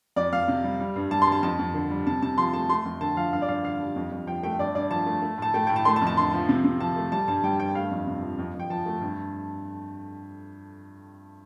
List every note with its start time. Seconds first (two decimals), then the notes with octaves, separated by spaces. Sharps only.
0.16 F2 D5
0.33 F2 F5
0.48 C3
0.64 G3
0.80 G3
0.96 G2
1.11 G3 A5
1.22 C6
1.27 G2 A5
1.43 F2 A5
1.59 F2
1.74 D3
1.91 G3
2.06 C3 A5
2.22 C3 A5
2.38 F3 C6
2.53 A3 A5
2.69 A3 C6
2.85 F2
3.01 D3 A5
3.17 F3 F5
3.33 G2 F5
3.42 D5
3.48 G2 F5
3.64 D3 F5
3.80 G3
3.96 F2
4.12 F2
4.27 F3 G5
4.43 A3 G5
4.59 G2 D5
4.75 G2 D5
4.91 F3 A5
5.06 A3
5.22 A3
5.38 A2 A5
5.54 A3 G5
5.67 A2 G5
5.76 A5
5.85 A3 C6
5.96 A5
6.02 F2
6.07 A5
6.17 D3 C6
6.33 F3
6.49 C3
6.64 C3
6.80 F3 A5
6.96 A3
7.12 G3 A5
7.28 G2 A5
7.44 G3 G5
7.60 G2 G5
7.75 A3 F5
7.91 F2
8.07 C3
8.22 F3
8.39 F2
8.54 F2
8.60 G5
8.70 F3 A5
8.86 A3
9.01 G2